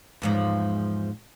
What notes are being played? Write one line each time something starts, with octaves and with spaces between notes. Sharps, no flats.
E2 G#2 F3